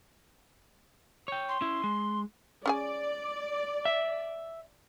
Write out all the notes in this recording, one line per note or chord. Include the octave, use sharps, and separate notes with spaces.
C#5 G5
C6
C#4 E4
G#3
C#4 G#4 D5 G#5
E5